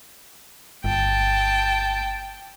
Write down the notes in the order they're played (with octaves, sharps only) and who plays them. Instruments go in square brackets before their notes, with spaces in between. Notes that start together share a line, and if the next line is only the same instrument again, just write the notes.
[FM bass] G1 [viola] G5 A5